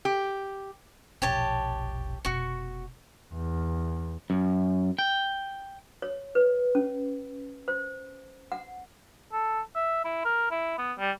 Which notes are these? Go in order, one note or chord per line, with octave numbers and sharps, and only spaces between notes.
G4
E1 A#1 G4 C#5 A5
F1 B2 F#4 C#6
E2
F#2
G5
C#5
B4
C#4
C5
F#5
A4
E5
E4
A#4
E4
B3
G3